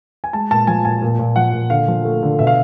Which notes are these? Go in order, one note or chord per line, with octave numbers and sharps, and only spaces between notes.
G#5
G#3 A5
A#2 A5
F3 G#5
A#2 G#5
A#2
A#2
F3 F#5
A#2
D3 F5
F3
A3
D3
B2 E5
F5